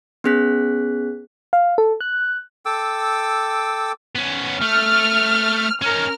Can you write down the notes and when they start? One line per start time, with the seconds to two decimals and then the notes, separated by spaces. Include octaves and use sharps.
0.24 B3 C#4 G#4 F#6 B6
1.53 F5
1.78 A4
2.01 F#6
2.66 A4 G5 D6 E6
4.16 B3 C#4
4.61 A3 F6
5.82 C#4 D#4 A#4 F6